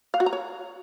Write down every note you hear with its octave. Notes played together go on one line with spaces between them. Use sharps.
F5
F#4
A#5
C#5